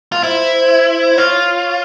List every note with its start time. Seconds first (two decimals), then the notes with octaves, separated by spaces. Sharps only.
0.12 F4
0.22 E4 C5
0.54 C5
0.86 C5
1.17 F4 C#5